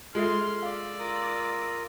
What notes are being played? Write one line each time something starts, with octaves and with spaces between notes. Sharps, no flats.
G#3 F4 A4 E5 C6 F6
D5 F5 E6
F4 A#4 D#6